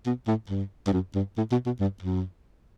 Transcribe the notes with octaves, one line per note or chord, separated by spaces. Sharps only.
B2
A2
G2
G2
F#2
G2
A2
B2
B2
G2
F#2